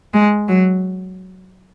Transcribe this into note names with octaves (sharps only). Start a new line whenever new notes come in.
G#3
F#3